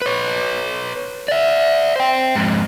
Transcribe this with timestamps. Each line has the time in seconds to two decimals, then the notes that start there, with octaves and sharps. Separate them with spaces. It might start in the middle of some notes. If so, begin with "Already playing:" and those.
0.02 B4 C#5
1.28 D5 E5
1.96 C5 G5
2.35 F2 G#2